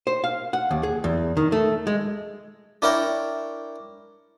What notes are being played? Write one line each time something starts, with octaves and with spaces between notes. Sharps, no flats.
C5
F5
F#5
D#2
G#4
E2
D#3
A3
G#3
D4 E4 A#4 C#5 G5 A#5